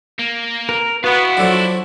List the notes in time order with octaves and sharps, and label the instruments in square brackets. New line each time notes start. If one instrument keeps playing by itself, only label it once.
[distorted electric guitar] A#3
[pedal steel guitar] A#4
[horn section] B3 [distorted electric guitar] E4 F5 [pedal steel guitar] F#4
[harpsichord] F3 F#3 [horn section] D4 A4 D5